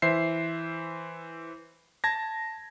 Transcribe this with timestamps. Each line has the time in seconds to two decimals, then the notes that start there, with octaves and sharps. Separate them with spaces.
0.02 E3 C5 E5 C7
2.04 A5 G#6 A#6